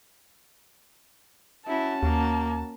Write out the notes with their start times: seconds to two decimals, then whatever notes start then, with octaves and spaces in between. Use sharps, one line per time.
1.68 C#4 E4 F#4 A5
2.03 D#2 A#3